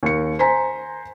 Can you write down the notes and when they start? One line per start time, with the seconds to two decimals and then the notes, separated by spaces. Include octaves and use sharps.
0.03 D#2 C#7
0.39 C5 G#5 A#5 C6 B6